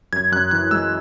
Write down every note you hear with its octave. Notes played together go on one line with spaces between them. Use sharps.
F#2 G#6
F#2 F#6
E3 F#6
G#3 E6